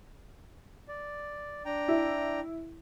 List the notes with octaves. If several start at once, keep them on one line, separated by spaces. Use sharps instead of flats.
D5
D4 G5 A#5
E4